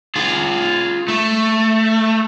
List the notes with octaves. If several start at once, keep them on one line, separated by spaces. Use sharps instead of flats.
F4 G#4
A3